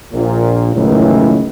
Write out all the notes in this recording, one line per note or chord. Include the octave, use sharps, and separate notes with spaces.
A#1 A#2
C#2 F#2 A2 D#3 E3